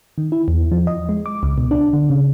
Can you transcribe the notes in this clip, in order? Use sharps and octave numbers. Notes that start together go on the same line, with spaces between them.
D#3
E4
E2
F3
D#5
G#3
D6
C#2
B2
D4
D3
C#3